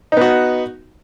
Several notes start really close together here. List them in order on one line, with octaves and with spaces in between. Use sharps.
D#4 B3 F#4